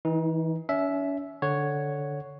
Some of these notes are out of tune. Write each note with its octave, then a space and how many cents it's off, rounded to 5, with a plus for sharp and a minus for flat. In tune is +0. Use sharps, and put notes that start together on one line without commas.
E3 -20 D#4 +30
C#4 +35 E5 +0
D3 -5 C#5 +0 F#5 +0